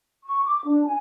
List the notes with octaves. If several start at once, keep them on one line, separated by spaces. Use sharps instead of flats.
C#6
D6
D4
G#5